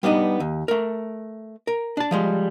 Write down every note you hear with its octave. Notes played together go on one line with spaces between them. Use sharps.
G3 B3 D4 D#4 B4
D#2
A3 A#4
A#4
D4 A5
F3 G3 G#3